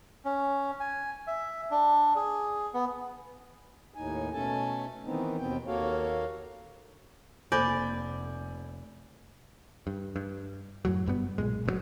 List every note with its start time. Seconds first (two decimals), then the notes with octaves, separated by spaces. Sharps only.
0.25 C#4
0.80 G#5
1.27 E5
1.71 D4
2.16 G#4
2.74 B3
3.94 D#2 A2 D#4 G#5
4.34 B2 A3 C#4 A4 G#5 A5
5.05 D#3 E3 B3 C4 D#4
5.38 D#2 B2 B3 C4 G5
5.67 D#2 A#3 F#4 A4 C#5 F5
7.52 F1 A#3 A4 C5 D5 G#5 B5 G6
9.87 G2
10.16 G2
10.85 F#2 A2 F#3
11.06 G1 G2 G3 B3
11.38 B1 A#2 G#3
11.66 G1 C3 F#3